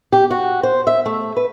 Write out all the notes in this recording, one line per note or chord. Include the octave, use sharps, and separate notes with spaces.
G4
F#4
C5
E5
A3
B4